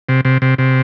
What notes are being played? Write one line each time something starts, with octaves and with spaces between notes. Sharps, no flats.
C3
C3
C3
C3